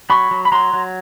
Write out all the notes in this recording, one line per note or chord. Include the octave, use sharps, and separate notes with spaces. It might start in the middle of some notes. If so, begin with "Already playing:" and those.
F#3 B5 C#6
F#3
B5
F#3 A#5 C6
F#3